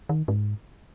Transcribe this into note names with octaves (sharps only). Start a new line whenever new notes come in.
D#3
G#2